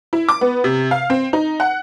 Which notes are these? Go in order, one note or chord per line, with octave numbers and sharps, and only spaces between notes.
E4
D6
B3
C3
F5
C4
D#4
F#5